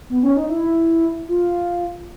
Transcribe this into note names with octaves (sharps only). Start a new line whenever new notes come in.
B3
C#4
D#4
E4
F4